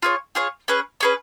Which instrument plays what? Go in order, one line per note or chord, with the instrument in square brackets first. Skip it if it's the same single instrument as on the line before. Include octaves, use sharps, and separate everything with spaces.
[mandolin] F4 G#4 C#5
F4 G#4 C#5
C#4 G#4 B4
C#4 G#4 B4